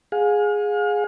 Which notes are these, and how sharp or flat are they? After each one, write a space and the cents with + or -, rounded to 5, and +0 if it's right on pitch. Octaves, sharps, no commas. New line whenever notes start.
G#4 +0 F5 +40